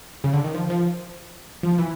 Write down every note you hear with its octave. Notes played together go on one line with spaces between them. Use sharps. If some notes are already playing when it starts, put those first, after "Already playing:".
C#3
D3
D#3
F3
F3
F3
E3